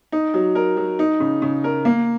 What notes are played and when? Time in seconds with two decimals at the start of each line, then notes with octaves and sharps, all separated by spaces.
0.12 D#4
0.34 F#3
0.55 A#4
0.77 F#3
0.99 D#4
1.20 C#3
1.42 C#3
1.64 A#4
1.85 A#3